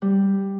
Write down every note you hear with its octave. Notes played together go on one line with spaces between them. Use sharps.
G3